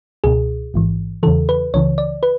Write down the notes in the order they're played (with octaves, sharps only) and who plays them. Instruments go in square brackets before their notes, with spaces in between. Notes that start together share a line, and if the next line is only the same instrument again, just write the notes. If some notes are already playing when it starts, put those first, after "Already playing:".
[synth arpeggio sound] C#2 B2 G#4
A1 G#2 E3
E2 C#3 E3 A4
B4
C#2 C#3 E3 C#5
D5
B4